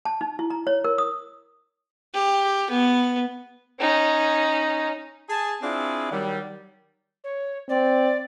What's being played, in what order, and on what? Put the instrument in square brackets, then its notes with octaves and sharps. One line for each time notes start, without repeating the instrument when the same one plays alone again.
[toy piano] A5
D#4
E4
A#5
C#5
A#4
D#6
[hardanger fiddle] G4
B3
[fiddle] C#4 D#4
[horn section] G#4 A5
C4 D4 E4 F4 G#4
D#3 F#3 G3
[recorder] C#5
[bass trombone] C4 [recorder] D5